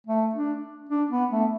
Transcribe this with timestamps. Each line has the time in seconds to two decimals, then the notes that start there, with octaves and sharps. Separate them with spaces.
0.07 A3
0.35 D4
0.89 D4
1.11 B3
1.31 A3